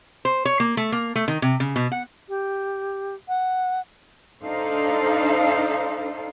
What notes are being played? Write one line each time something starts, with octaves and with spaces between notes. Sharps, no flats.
C5
C#5
A#3
A3
A#3
A3
D#3
C3
C#3
B2
F#5
G4
F#5
D4 D#4 A4 C5 F5